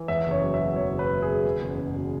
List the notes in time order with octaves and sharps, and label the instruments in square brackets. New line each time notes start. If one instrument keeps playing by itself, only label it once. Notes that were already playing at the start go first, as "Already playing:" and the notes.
Already playing: [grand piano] E3
E2 E5
F#1
C#5
F#3
E5
B2
E2 C#5
F#1
B4
F#3
G#4
B2
E2
F#1
F#1
B2